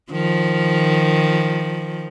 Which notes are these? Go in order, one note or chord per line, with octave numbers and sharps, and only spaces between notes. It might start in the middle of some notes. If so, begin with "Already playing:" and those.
D#3 F3